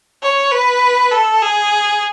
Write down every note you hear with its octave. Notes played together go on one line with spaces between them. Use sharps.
C#5
B4
A4
G#4